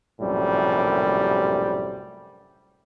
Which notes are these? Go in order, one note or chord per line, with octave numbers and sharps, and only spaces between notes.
A#1 F#2 A2 C3 G3